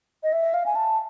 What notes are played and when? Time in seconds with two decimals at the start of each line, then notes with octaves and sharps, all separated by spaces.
0.23 D#5
0.33 E5
0.54 F5
0.66 G#5
0.75 A5